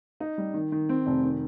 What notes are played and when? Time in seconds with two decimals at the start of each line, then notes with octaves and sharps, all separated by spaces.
0.20 D#4
0.38 G3
0.54 D#3
0.72 D#3
0.89 C4
1.06 F1
1.23 D#3